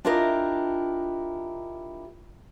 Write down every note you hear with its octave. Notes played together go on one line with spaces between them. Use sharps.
D4 E4 F4 G4 A#4 D#5